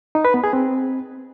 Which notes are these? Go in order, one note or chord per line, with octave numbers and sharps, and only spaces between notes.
D#4
B4
B3
G#4
C4